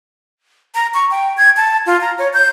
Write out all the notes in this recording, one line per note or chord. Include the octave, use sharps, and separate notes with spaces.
A#5
C#6
G5
G#6
A5
F4
A#5
C#5
G6